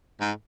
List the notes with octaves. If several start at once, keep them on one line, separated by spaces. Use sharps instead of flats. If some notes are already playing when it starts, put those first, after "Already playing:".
G#2